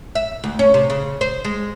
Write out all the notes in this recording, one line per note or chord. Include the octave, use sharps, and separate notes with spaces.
E5
D2
C#4
C3
C#3
C5
G#3